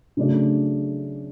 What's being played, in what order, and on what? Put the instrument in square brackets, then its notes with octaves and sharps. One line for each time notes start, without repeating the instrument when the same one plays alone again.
[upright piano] C#3 F#3 A3 D4